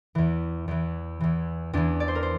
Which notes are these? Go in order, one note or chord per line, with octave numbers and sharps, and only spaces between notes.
E2 E3
E2 E3
E2 E3
E2 E3 D4
D5
C5
A#4
C5